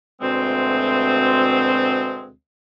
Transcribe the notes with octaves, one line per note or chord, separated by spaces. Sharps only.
D2 B2 G#3 A3 C4